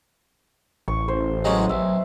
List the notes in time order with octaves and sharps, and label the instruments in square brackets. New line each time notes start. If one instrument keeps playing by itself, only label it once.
[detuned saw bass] A1 [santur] C#6
[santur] C5
[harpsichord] F#3 G#3 C#4 [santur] D#5
[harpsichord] B1 [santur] E5